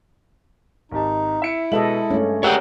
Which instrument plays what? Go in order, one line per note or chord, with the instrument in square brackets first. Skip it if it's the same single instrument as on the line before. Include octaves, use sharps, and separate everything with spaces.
[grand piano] G#1 G4 A5 [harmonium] D#4
[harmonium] E4 [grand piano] E5 C#7 D7
[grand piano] B2 E5 F#7 [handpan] G#3 A4 D#5
[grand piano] G2 [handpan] A3 C#4
[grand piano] G4 [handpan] G#4 A#4 [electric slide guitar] C#5 F#5 G5